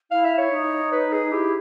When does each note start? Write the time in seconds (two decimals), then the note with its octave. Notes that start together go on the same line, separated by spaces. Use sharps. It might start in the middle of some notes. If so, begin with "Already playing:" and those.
0.11 E4 F5
0.24 E5
0.38 C#5
0.51 D#4
0.92 B4
1.12 G#4
1.32 E4 G4